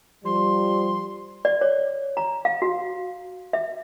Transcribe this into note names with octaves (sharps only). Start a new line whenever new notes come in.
F3 G3 C6
D5
C#5
A#5
F5
F#4
E5